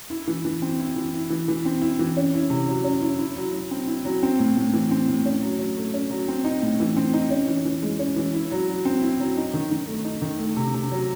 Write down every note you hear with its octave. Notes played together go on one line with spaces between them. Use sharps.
E4
E3
E3
C4
E4
E3
E4
E3
E3
C4
E4
E3
C#4
E4
C3
F#3
C#4
E4
E4
F#3
F#3
C4
E4
F#3
C4
A2
A2
E3
C4
A2
C#4
F#3
F#3
A3
C#4
F#3
C4
D#4
A2
E3
C4
D#4
C#4
E3
E3
G#3
C#4
E3
E4
F#3
F#3
C4
E4
F#3
D#4
D#3
D#3
A3
D#4
D#3
A3
C3
C3
F#3